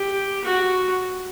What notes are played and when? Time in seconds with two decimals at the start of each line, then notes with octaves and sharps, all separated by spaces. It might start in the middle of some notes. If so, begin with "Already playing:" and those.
Already playing: G4
0.44 F#4